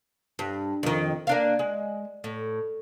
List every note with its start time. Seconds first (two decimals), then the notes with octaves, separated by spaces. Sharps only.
0.39 G2
0.83 F2 D#3
1.27 A#3 D4 F5
1.59 G#3
2.24 A2